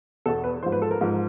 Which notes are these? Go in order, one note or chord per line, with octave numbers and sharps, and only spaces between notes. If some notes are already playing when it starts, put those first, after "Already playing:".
E2 B2 A4
B4
G#2 F3 C5
B4
A4
A#4
G#2 F3